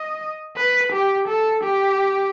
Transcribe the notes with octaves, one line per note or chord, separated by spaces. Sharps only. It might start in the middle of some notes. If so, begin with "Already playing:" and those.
Already playing: D#5
B4
G4
A4
G4